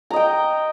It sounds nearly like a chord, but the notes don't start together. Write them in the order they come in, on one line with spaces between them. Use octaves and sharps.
A#5 D#5 G5